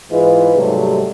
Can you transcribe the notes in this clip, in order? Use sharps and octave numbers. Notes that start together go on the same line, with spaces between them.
G#2 E3 G#3 F4 B4
G#2 C3 F#3 G3 A3